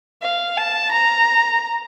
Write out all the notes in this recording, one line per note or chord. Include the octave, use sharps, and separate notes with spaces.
F5
A5
A#5